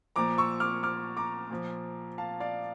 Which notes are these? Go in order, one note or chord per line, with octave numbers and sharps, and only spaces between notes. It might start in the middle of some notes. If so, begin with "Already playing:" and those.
A#2 F3 A#5 D6
C#6 E6
D6 F6
D6 F6
A#5 D6
A#2 F3
F5 A5
D5 F5